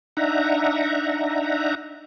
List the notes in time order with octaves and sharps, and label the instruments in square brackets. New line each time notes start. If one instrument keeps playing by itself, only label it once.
[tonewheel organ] D4 D#4 E5 F#5 A#5